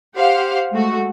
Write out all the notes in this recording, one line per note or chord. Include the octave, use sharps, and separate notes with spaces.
G4 C5 F5 F#5
G#3 A3 F#4